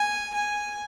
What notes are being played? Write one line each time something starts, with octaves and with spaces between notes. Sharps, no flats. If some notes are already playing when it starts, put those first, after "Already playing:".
Already playing: G#5
G#5